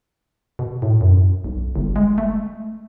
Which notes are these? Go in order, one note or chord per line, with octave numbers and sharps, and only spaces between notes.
B2
A2
F#2
B1
G1
G#3
A3